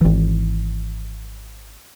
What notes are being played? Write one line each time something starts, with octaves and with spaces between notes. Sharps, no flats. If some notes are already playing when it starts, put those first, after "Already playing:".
G#1 E3